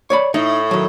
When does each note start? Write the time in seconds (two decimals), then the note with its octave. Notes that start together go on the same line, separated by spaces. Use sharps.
0.10 C#5 D5 B5
0.34 A2 D#4
0.71 D#3 F#3